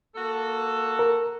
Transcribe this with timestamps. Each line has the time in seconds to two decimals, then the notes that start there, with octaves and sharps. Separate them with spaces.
0.16 A#3 F#4 A4
0.99 A#4